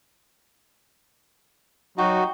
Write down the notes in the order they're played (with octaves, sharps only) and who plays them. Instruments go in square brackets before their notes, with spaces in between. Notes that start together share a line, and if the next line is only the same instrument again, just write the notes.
[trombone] F#3 [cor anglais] D#4 [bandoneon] F#4 [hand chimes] F#5 G5 C#6